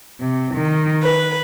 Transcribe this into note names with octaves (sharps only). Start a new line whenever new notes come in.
C3
D#3
B4